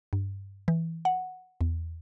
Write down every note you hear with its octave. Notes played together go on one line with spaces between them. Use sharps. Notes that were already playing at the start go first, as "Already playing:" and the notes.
G2
E3
F#5
E2